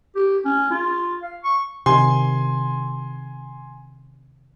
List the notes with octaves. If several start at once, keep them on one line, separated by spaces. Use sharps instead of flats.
G4
C#4
F4
F5
C#6
C3 D#3 G#5 C6